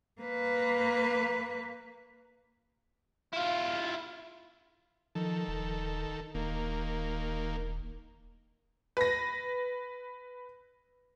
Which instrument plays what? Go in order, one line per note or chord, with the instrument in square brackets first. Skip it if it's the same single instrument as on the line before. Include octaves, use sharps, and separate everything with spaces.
[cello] A#3 B4
[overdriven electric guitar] E4 F4
[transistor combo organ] D#3 A4 [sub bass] F3
[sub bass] D#1
[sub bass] D#1 [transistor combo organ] D#3 A#3
[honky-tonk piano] B4 A#6